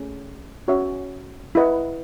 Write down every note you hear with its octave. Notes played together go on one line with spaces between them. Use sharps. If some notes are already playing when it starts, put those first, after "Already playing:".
Already playing: A3 C#4 G#4
C#4 F#4 C#5 E5
E4 B4 D#5 F#5